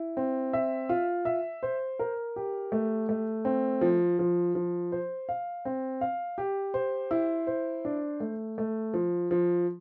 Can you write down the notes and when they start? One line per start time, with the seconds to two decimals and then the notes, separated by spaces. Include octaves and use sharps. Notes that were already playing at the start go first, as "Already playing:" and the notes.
Already playing: E4
0.17 C4
0.53 E5
0.89 F4
1.25 E5
1.63 C5
1.99 A#4
2.36 G4
2.72 A3
3.09 A3
3.45 C4
3.81 F3
4.19 F3
4.55 F3
4.92 C5
5.29 F5
5.65 C4
6.01 F5
6.38 G4
6.74 C5
7.11 E4
7.47 C5
7.85 D4
8.20 A3
8.58 A3
8.94 F3
9.31 F3